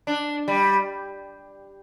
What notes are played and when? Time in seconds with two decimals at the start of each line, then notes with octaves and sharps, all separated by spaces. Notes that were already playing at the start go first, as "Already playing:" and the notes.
0.07 D4
0.48 G3